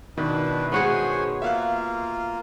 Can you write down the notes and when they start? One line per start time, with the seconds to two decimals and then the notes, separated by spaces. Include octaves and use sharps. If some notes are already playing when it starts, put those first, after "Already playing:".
0.17 B2 D#3 D4 E4 B4
0.72 B3 F#4 G#4 C5 C#5 G#5
1.42 A#3 F4 E5 F5 F#6